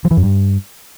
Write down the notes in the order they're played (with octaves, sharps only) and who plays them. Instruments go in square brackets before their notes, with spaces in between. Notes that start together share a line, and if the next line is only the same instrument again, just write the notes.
[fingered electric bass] F3
E3
F#2
G2